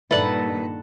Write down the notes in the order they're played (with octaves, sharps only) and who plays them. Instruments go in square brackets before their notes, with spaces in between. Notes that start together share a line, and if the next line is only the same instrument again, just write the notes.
[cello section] G2 A#2 D#3 [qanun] A4 F#5 [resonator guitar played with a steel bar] B4 [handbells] D5 E5